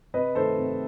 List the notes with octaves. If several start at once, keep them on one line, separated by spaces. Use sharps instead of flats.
C3 B4 D#5
D#3 A3 A4 C5
C3